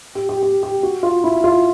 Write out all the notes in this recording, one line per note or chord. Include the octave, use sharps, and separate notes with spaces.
G4
G4
G4
G4
F#4
F4
E4
F4